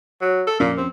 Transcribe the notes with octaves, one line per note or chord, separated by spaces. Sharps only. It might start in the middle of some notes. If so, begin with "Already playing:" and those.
F#3
A4
F2 A#2 C#4
C4